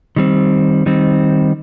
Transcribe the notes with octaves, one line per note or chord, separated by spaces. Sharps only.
D#3 G3 C4
D#3 G3 C4